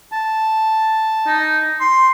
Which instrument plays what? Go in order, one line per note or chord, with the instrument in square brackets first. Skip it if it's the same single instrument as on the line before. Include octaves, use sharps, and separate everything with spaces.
[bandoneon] A5
[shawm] D#4
C6